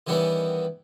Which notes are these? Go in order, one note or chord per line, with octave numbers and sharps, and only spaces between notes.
D#3 E3 G3 B3 C#4 E4